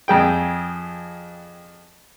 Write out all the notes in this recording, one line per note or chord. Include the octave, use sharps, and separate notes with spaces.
F2 G#4 G5